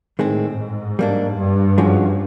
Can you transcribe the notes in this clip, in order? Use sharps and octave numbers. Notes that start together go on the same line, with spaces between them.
A2 D#3 G#3 C4
G#2
G3 A#3 D4
G2
F3 G#3 C#4 F#4